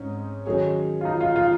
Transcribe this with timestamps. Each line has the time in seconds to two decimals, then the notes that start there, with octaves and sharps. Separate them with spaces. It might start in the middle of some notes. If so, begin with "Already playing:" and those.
Already playing: G#2 C4 C#4 D#4
0.45 D#3 F#3 C#4 G#4 C#5
1.01 F4
1.05 D#4
1.21 F4
1.36 F4